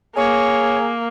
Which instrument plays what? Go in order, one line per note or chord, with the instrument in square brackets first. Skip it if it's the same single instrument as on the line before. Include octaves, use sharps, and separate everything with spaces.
[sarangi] A#3 [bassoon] G#4 [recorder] C#5